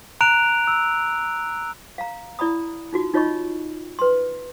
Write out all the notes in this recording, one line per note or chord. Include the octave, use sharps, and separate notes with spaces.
A#5 F#6 D7 F7
E6
F5 A#5
E4 D5 A#5 B5 D#6
D#4 F4 F#4
D#4 F4 C#5 D#5 B5 C#6
B4 C6